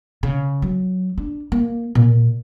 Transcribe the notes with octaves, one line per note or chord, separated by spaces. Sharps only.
C#3
F#3
D4
A#3
A#2